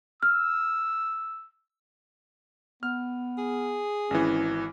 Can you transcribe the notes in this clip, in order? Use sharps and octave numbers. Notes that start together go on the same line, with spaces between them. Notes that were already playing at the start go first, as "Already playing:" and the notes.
E6 F6
B3 F6
G#4
G#1 E3 C#4